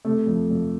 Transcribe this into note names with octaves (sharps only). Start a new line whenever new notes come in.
C3 A3
F2
F2